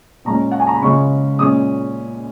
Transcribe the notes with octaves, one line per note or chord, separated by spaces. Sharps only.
A#2 G#3 C#4 A#5
F#5
G#5
A#5
B5
C#2 C#3 G#3 C#4 C#6
A#2 G#3 C#4 D#6